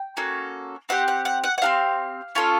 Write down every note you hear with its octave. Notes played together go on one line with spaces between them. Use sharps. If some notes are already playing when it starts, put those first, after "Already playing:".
Already playing: G5
A#3 C#4 F#4 A4
C4 D#4 G4 F#5
F#5
F#5
F#5
F#5
C4 D#4 G4 F5
C#4 F4 A4